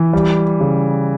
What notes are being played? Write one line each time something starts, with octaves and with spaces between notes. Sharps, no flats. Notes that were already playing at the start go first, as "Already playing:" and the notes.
Already playing: E3
G3
C#3